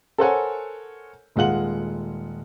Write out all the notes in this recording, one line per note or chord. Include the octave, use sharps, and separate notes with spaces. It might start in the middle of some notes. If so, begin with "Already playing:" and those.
A4 A#4 C5 C#5 F#5 G#5
D#1 G#3 F4 F#5 F#7